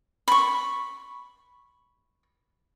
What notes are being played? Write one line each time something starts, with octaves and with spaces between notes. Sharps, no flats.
B5 C#6